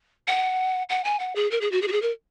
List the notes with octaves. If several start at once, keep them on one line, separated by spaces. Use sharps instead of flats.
F#5
F#5
G#5
F#5
G#4
A#4
G#4
F#4
G#4
F#4
G#4
A#4